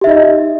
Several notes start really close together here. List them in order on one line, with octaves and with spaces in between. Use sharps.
G4 E5 D#4 D#5